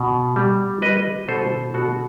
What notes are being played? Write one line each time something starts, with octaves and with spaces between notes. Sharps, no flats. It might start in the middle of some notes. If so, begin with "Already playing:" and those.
Already playing: B2
G3
G3 B4 D#5
B2 A4 C5
B2 F#4 A4